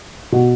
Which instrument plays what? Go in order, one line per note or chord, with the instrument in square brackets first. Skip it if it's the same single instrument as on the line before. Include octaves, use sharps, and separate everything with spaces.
[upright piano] B2